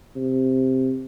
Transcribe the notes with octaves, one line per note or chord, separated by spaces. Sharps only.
C3